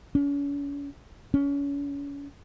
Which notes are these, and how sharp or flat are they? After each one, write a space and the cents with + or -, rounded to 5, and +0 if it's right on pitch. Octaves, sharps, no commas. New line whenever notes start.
C#4 +40
C#4 +35